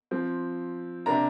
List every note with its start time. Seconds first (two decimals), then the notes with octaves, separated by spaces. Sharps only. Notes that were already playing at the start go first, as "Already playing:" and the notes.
0.11 F3 C4
1.06 C3 A#3 D4 A#5